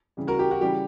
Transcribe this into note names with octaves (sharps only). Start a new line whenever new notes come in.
C#3 E3 G3
F#4 A#4
G4
F#4
C#3 E3 G3 G4